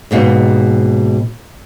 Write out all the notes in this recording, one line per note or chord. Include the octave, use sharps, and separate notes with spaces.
D#2 G#2 B2 D#4